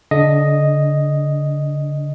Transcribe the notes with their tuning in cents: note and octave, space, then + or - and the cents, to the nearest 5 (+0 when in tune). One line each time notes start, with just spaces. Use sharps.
D3 -35 D4 +0 D#5 +0